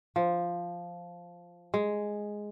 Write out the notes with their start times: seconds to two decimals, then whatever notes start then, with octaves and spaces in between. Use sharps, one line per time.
0.16 F3
1.74 G#3